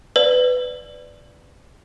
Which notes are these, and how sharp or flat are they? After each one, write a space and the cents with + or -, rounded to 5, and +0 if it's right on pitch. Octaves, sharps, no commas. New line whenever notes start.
B4 +15 D5 +0